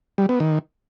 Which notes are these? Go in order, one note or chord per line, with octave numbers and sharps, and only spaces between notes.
G3
B3
D#3